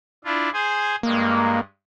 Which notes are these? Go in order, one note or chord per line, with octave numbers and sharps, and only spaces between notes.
D4 E4 F4
G#4 C5 G#5
G2 G#3 A#3